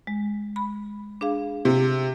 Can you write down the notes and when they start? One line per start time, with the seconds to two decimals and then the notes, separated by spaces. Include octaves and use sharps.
0.07 G#3
0.56 B5
1.21 D4 G#4 F5
1.65 C3